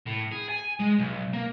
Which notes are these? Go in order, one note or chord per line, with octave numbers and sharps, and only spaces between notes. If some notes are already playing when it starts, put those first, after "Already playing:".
A2
G#4
G#5
G#3
B1
A#3